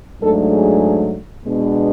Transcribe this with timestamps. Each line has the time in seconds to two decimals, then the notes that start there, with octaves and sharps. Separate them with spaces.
0.21 G#2 F#3 A3 D4 A4
0.51 G#4
1.44 B2 G#3 B3 D4